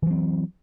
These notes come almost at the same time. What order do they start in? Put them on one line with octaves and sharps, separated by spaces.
E3 F#3 C4